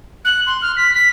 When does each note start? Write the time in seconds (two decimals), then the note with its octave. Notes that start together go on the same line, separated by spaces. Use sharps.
0.25 F#6
0.46 C6
0.62 F6
0.77 B6
0.94 B6